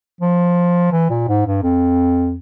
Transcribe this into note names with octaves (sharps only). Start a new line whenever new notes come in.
F3
E3
A#2
G#2
G2
F2